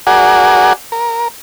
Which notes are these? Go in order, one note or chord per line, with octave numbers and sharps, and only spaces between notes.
F#4 G#4 A#4 D5 F#5 G#5
A#4